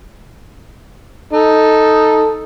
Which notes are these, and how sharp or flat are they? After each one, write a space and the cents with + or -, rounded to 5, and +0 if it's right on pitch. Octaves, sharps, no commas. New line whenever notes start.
D#4 +0 A4 +0